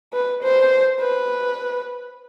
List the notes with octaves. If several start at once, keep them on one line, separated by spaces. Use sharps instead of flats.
B4
C5
B4